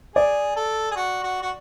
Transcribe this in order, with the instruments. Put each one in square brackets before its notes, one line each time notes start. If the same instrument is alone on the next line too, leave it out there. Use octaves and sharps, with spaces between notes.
[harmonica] G#4 [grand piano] D5
[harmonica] A4
G#4
F#4
F#4
F#4